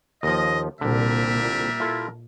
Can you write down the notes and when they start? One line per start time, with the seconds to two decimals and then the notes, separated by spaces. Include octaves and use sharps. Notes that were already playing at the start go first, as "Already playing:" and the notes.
0.23 D#2 F3 D#5
0.81 C2 A#2 D3 G3 A#4 E5
1.80 E4 F4 A4